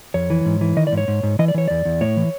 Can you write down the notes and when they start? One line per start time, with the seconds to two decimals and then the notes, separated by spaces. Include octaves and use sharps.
0.14 F2 C#5
0.30 E3
0.46 G#2
0.61 E3
0.77 D#3 D#5
0.87 D5
0.92 G#2
0.97 C#5
1.08 G#2
1.23 G#2
1.39 E3 D#5
1.48 D5
1.54 E3 C#5
1.68 E2 D5
1.85 E2
2.01 A2 C#5
2.17 E3